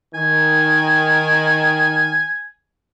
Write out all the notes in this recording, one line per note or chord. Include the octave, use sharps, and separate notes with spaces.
D#3 G#5